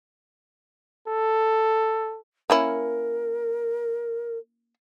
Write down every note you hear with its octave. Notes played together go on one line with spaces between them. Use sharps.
A4
A#3 C#4 E4 A#4